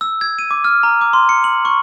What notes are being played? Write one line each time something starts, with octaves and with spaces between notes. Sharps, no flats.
E6
G#6
D#7
D6
F6
A#5
D6
C6
C#7
F#7
C#6